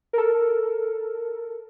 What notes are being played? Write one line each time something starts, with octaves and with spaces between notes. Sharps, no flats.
A4 A#4